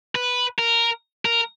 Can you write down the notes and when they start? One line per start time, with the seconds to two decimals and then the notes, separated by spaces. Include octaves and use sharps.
0.15 B4
0.59 A#4
1.25 A#4